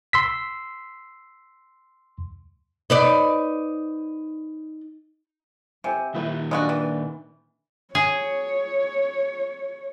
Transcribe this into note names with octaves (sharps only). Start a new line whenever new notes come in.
C6 E6 B6
D#4 B4 D5
C3 C5 G#5
A#2 D#3 D#4 E4 B4
C#3 D4 F4 F#4 D#5
E3
G#4 C#5